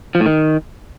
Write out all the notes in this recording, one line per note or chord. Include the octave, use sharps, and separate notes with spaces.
F3
A2
D#3